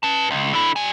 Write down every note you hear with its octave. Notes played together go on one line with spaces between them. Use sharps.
B4 A5
C#2
D3 E4
G3 G#5